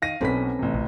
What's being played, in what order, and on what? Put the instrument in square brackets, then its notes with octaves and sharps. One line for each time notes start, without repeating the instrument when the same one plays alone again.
[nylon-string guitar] D#3 [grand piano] F5 A#6 D#7
[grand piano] B1 B2 B6 [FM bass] C4 [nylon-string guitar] C#4 A4 B4
[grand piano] A1 C3
[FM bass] A#1